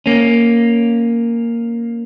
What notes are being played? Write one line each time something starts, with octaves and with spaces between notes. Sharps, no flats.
A#3 C#4